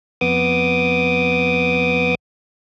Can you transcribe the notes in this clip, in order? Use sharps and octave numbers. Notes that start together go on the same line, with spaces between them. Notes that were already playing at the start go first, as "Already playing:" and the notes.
F2 B3 D6 D#6